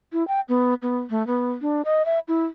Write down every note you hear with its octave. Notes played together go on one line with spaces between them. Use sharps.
E4
G5
B3
B3
A3
B3
D4
D#5
E5
E4